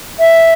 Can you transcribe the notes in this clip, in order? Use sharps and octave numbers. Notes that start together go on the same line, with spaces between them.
E5